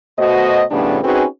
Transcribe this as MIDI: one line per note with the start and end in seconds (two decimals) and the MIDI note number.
0.18 0.64 47
0.18 0.64 57
0.18 0.64 66
0.18 0.64 72
0.18 0.64 75
0.71 0.98 41
0.71 0.98 45
0.71 0.98 49
0.71 0.98 55
0.71 0.98 59
0.71 0.98 62
1.03 1.25 60
1.03 1.25 61
1.03 1.25 63
1.03 1.25 66
1.03 1.25 68
1.03 1.25 71